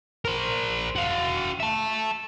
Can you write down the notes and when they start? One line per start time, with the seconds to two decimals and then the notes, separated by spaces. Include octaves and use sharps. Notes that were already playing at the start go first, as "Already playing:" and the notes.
0.25 A#4 C5
0.96 F#4 F5
1.60 E5 A5